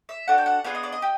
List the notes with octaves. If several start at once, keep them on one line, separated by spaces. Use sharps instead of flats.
E5
D4 F#4 A4 F#5
G5
F#5
B3 D4 F4 G#4 F5
D#5
D5
D#5
G4